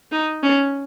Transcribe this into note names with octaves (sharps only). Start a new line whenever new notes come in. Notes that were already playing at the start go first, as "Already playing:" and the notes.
D#4
C#4